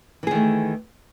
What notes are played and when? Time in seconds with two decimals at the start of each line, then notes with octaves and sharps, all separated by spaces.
0.23 E3
0.27 G#4
0.31 D#3
0.35 A3